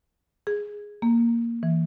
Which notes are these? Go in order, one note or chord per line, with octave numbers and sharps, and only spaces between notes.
G#4
A#3
E3